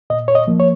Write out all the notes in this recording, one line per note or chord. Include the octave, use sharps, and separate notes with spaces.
A#2 D#5
C#5
D#5
F3 A#3
C#5